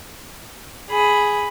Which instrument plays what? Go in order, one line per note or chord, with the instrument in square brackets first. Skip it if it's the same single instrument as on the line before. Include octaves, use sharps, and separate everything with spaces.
[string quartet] G#4 B5